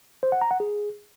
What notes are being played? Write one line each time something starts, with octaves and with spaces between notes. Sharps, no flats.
C5
F#5
A#5
F#5
G#4